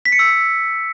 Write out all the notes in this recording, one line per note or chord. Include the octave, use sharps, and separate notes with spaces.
B6
C#7
E6